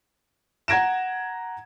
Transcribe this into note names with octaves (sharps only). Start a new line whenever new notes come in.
F#5 A#5 G#6 A#6 D7 E7